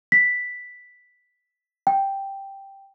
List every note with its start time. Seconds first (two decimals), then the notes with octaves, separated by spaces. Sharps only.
0.12 B6
1.87 G5